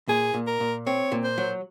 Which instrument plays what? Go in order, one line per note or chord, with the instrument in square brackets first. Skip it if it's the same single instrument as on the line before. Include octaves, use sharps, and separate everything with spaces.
[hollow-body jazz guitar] A#2 [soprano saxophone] G#4
[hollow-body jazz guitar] A#2
[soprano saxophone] A#4
[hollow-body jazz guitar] A#2
[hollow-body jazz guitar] C4 [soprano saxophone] C#5
[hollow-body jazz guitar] A#2
[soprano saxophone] C5
[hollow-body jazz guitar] F#3